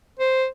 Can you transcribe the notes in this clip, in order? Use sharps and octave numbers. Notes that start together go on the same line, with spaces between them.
C5